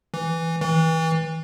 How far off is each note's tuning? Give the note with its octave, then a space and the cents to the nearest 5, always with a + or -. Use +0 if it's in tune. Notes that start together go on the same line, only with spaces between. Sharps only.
E3 +0
E3 -30